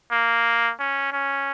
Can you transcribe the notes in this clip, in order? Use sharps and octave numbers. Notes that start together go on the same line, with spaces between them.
A#3
C#4
C#4